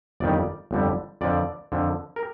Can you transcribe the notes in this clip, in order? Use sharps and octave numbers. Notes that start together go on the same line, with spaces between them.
G1 F2 D#3 G3 D5
G1 F2 D3 G3
F2 D3 F3 D5
F2 D3 F3
A#4